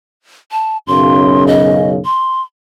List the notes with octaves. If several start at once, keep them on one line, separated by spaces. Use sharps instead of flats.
A5
B1 F#2 C#3 C6
D#5
C6